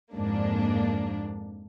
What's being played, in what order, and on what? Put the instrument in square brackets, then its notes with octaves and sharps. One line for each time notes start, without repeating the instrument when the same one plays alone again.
[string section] F2 G#2 A#3 D4